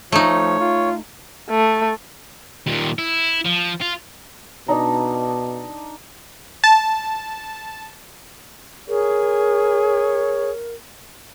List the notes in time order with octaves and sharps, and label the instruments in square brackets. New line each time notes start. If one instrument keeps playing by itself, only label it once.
[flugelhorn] F3 [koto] A3 D#4 [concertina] C#5
[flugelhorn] F4
[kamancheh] A3
[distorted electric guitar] D#2 A#2
E4
F3
F4
[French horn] B2 [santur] D4 D#4 A#5
[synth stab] A5
[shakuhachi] G#4 [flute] A#4 [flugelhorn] C#5